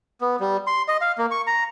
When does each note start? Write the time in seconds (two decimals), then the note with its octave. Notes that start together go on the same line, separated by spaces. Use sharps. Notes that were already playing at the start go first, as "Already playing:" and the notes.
0.21 B3
0.40 G3
0.67 C6
0.88 D#5
1.01 F5
1.18 A#3
1.31 C#6
1.47 A#5